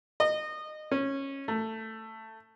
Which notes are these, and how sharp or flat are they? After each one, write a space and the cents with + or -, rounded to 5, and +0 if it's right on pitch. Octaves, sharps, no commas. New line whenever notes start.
D#5 -25
C#4 -15
A3 +15